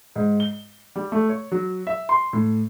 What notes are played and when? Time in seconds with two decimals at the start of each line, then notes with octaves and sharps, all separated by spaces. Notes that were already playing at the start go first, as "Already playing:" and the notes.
0.16 G#2
0.40 G7
0.96 G3
1.12 A3
1.29 C#5
1.52 F#3
1.87 E5
2.09 C6
2.33 A2